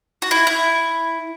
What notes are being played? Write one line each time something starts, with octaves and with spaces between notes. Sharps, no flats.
F#4
E4
E4